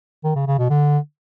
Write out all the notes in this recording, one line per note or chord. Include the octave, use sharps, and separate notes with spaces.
D#3
C#3
C#3
B2
D3